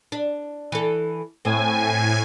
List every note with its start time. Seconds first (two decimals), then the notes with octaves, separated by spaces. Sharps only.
0.12 D4
0.72 E3 A4
1.45 A2 C4 G#5